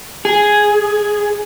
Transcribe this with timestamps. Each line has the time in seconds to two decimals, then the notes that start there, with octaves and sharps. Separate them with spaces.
0.25 G#4